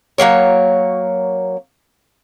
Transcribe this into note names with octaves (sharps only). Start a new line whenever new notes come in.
F#3 G3 A#3 C#5